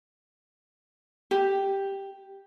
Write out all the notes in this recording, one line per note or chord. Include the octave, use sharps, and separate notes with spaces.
G4